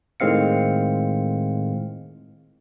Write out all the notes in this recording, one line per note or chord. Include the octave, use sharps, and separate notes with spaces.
A2 D#3 G#3 C4 F5 C#7